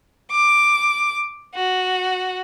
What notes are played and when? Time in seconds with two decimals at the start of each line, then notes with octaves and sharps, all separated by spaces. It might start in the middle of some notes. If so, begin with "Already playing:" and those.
0.31 D6
1.55 F#4